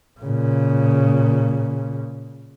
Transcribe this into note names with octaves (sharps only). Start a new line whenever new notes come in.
A#2 C#3